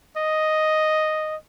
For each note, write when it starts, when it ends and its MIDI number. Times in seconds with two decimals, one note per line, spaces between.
0.17 1.36 75